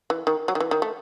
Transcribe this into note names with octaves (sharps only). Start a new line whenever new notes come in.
E3
D#3
F#3
D#3
E3
D#3
A3